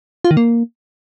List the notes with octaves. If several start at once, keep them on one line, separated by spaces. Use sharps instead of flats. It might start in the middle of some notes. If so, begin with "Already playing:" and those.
F4
D#3
A#3